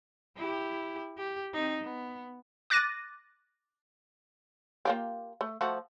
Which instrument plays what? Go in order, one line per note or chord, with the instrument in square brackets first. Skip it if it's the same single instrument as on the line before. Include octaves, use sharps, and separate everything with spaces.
[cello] E4 G4
G4
C4 D#4
B3
[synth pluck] D6 F#6 A6 A#6 D#7
[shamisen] A#3 F4 G4
A3
F3 A3 F#4